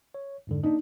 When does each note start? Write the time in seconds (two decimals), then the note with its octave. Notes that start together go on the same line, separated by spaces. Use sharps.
0.14 C#5
0.47 F2 G#2 D3
0.63 A#3 D4 D#4